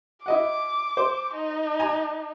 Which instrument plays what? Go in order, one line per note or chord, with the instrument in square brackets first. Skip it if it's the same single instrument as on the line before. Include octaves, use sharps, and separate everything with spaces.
[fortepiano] E4 D#5 F#5 [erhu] D6
[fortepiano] C5
[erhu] D#4
[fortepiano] G#5 A#5